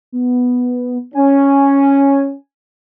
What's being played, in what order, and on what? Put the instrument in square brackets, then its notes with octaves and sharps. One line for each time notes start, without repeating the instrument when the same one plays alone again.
[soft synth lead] B3
[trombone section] C#4 [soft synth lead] G#5